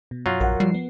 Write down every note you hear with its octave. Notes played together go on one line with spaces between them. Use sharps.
B2
F#2 F#3 F4
A#1 A#4 F#5
F3 G3 C7
B3